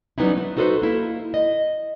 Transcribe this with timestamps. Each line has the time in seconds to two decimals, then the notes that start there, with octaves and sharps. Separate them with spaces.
0.18 F#3 G3 B3 C#4 D#4 E4
0.37 A3 B4
0.57 D#4 F#4 A4 B4 C5
0.82 A#3 E4
1.34 D#5